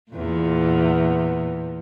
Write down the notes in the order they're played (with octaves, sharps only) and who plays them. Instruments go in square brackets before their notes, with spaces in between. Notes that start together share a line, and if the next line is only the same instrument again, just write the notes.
[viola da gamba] E2 A#2